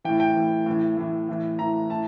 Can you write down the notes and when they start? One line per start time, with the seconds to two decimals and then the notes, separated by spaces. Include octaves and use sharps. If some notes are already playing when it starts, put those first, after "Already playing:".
0.04 A2 E3 G5
0.20 G5
0.36 A2 E3
0.66 A2 E3
0.97 A2 E3
1.29 A2 E3
1.59 A2 E3 A#5
1.90 A2 A5